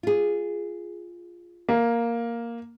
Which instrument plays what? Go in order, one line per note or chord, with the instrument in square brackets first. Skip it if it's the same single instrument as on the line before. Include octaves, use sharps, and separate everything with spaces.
[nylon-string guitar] F4 G#4
[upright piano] A#3